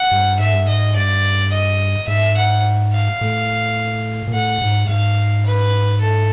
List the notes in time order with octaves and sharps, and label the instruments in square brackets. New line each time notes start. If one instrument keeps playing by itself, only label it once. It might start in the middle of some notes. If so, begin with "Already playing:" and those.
Already playing: [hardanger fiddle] F#5
[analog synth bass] G2
[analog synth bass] G#2 [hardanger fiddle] E5
[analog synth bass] G2
[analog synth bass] G#2 [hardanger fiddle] D#5
[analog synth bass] G2 [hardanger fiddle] D5
[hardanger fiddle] D#5
[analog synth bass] G#2 [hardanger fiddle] E5
[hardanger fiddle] F#5
F5
[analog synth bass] A2
A#2
[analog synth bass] A2 [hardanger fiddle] F#5
[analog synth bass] G#2
[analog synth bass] G#2 [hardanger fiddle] F5
[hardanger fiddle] B4
A4